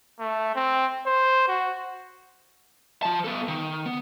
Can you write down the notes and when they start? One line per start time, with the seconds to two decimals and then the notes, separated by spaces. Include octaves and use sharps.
0.19 A3
0.55 C4
1.06 C5
1.48 F#4
3.03 F3 A5
3.24 B3 A4
3.48 D#3
3.86 B3